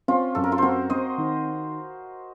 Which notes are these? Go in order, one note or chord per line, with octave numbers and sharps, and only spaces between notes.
C4 C#4 F4
F#2 A4
A#4
F4 A4
C4 F#4 A#4 C5
C4 C5 D#5
D#3